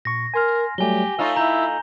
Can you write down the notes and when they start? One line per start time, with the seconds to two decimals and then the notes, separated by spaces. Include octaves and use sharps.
0.05 A#2 C#6 A#6
0.34 A#4 G#5 C6 F6
0.78 F#3 G3 A3 G4 G#5 G7
1.19 A3 D#4 F4 C#5 E6
1.36 E4 A#5 G6